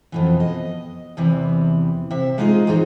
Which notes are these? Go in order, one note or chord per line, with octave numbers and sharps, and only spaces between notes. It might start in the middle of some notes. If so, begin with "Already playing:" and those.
F2 B2 E3
D#5
E2 C3 E3
C3 E5
G#3 D#4 F4 G#4 D#5
E2 A#2 B3 C4 D#4